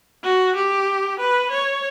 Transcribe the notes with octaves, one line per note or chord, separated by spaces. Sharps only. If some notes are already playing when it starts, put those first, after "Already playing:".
F#4
G4
B4
C#5